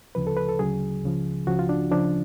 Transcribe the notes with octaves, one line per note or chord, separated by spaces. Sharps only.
D2 C#3 F3 B4
A4
B4
A4
D2 C#3 F#3 G#4
C#2 C#3 F3
C#2 C#3 F3 F#4
F4
D4
D2 C#3 F3 D4